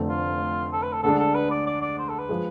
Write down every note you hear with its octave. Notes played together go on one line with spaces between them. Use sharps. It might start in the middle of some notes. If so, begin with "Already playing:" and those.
Already playing: F1 F2 D3 A3 C4
F4
A4
B4
A4
D2 D3 G#3 D4 A4
A4
B4
D5
D5
D5
C5
A4
B4
F3 G#3